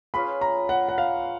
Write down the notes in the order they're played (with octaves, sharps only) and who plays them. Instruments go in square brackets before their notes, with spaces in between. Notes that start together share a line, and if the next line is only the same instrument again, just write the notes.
[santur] C#4 F4 G#4 B4 [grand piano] B5
[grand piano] A#5
F#5
F#5
F5